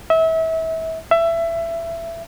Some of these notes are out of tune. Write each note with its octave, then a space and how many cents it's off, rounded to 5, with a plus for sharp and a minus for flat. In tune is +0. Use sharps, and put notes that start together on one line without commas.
E5 -30
E5 +20